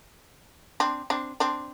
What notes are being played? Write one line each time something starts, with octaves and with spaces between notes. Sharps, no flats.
C4 D4
C4 D4
C4 D4